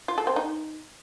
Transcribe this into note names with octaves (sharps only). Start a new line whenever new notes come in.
F4
A4
C4
D#4